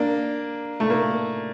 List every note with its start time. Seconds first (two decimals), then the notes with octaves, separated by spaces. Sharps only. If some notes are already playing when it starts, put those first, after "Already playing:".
Already playing: A#3 D4
0.80 A3
0.90 A#3